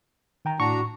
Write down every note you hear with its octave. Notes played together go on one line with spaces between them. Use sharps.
D#3 G5 A#5
A2 D4 F#4 A#5 C#6